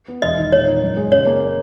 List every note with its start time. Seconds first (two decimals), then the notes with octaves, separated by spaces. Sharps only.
0.08 B3
0.22 E1 D#5
0.38 D#3
0.52 A#2 C#5
0.67 D#4
0.82 F#2
0.97 G#3
1.12 C#3 C#5
1.26 A#3